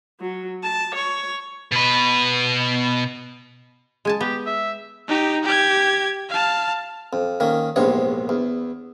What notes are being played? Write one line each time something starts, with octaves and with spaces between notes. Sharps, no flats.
F#3
A5
C#5
B2 B4
G#3 G#5 A5
B3 G4
E5
D#4 G4
G4 G#6
F5 A5
F2
D#3 A#3 C#4
A#1 E2 G#2 C3 C#5
E2